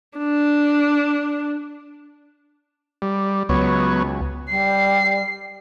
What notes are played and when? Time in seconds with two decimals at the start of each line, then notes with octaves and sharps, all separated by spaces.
0.18 D4
3.02 G3
3.49 C#2 F#3 B3 C#5
4.50 G3 C7